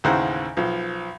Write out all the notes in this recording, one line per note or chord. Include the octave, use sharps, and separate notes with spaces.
A1 D#2 C#3 E3 C5 F#5
B1 F3